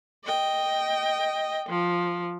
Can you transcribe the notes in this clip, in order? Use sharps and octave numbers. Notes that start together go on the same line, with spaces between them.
D#5 G5
F3